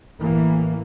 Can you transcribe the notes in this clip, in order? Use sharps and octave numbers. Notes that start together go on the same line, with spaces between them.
A1 A2 E3 A#3